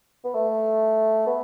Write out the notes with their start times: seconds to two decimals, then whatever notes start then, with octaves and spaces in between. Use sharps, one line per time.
0.24 B3
0.34 A3
1.27 B3